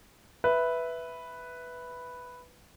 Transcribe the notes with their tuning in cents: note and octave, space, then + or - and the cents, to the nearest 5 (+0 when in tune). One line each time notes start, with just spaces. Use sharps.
B4 +0 E5 +0